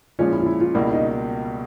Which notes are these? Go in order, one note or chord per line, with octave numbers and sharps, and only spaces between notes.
A#2 F3 G#3 C#4 F4
E4
F4
E4
F4
C#2 B2 G3 A#3 E4
D#4